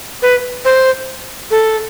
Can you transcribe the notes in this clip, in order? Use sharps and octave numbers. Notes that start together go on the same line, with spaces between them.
B4
C5
A4